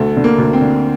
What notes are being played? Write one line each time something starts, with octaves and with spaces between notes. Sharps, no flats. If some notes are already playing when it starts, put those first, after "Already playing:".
Already playing: D2 A3
D3
A#3
D2
C4
D3